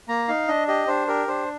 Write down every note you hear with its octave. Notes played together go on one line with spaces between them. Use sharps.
A#3 A#5
D#4 F5
D4 D#5
G4 D#5
D4 C5
G4 A#4
D4 C5